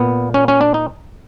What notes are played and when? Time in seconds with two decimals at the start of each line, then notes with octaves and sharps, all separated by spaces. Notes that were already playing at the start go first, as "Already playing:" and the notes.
Already playing: A#2 B3
0.34 C#4
0.48 C#4
0.61 D4
0.74 D#4